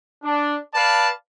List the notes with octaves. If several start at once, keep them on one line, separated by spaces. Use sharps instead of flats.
D4
B4 D5 F5 A5